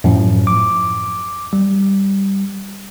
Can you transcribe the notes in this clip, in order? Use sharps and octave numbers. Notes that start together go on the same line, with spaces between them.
F#2 A2 F3
D6
G3